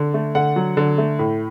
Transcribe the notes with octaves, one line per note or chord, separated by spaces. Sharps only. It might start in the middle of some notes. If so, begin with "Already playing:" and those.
Already playing: D3
A3
D3 F#5
F#3
D3
A3
A2